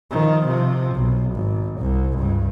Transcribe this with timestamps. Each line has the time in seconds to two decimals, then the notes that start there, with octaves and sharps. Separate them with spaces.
0.11 D#3 F3
0.46 C3 F3
0.95 B1
1.34 G#1
1.80 C2
2.17 C#2 G2